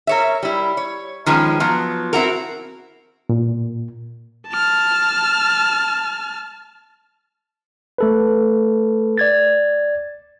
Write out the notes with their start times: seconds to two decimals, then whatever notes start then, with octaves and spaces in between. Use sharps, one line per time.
0.07 A#4 C#5 E5
0.43 G3 E4
0.77 C#5
1.26 D#3 F3 G#3 C#4 B4
1.60 F3 F#3 B3
2.13 C4 E4 F#4 A#4
3.29 A#2
4.48 A5 F6
7.98 A3 A4 B4
9.18 D5 G#6 A6